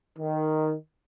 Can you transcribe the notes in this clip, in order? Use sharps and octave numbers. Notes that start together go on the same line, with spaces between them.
D#3